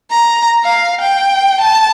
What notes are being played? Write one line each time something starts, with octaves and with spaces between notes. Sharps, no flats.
A#5
F5
G5
A5